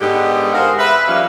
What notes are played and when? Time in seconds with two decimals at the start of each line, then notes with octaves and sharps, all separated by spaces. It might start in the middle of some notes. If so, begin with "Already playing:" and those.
0.01 G#2 D3 B3 G4
0.53 G#4 A#4 C5 F5 F#5
0.78 B4 E5
1.07 F3 G3 A#3 C#4 E5 F5